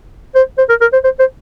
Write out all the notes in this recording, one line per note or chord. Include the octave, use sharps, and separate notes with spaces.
C5
C5
A#4
A#4
C5
C5
C5